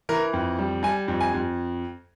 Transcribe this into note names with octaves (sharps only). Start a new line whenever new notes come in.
E3 A#4
F2
G3
G3 G#5
F2
G#5
F2